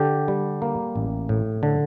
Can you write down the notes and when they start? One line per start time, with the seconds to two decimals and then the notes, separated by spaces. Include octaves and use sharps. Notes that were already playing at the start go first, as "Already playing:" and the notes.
Already playing: D3 G4
0.28 G3
0.62 A#3
0.96 A1
1.29 A2
1.63 D3